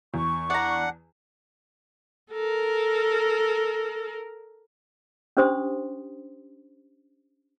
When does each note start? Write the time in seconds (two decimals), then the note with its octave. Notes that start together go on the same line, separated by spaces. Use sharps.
0.14 E2 C#6
0.50 D4 F#5 A#5
2.31 A4 A#4
5.37 C#4 D4 G4 C5 C6 D#6